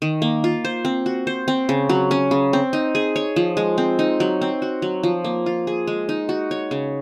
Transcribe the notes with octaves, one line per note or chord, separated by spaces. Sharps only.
D#3
A#3
F4
C5
C4
F#4
C5
C4
C#3
F#3
C#4
C#3
C4
D#4
G#4
C#5
F3
G#3
C4
D#4
F#3
C4
F#4
F#3
F3
A#3
F4
G#4
G#3
D#4
F#4
C#5
C#3